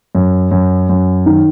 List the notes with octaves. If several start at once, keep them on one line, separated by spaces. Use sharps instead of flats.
F#2
F#2
F#2
D#3